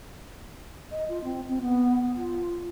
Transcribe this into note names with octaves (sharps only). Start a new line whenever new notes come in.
D#5
F4
C4
C4
B3
F4